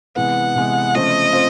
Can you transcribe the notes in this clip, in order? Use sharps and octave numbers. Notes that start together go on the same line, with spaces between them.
C3 E3 G#3 B3 F#5
C3 E3 G#3 B3
C#3 F3 A3 C4 F4 D#5
C4 F4